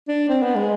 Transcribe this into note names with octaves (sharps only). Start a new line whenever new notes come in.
D4
C4
B3
G#3